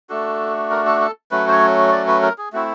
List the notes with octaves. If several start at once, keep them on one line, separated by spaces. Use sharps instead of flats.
A3 D4 F#4 A4
A#4
A4
A4
F#3 A3 C#4 F#4 B4
C5
C#5
D5
B4
A#4
G#4
A3 C4 E4 F#4